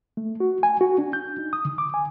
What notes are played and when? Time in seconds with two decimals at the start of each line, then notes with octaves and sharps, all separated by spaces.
0.17 A3
0.40 F#4
0.63 G#5
0.81 F#4
0.98 D4
1.13 G6
1.38 D#4
1.53 D#6
1.65 D3
1.78 D6
1.94 G#5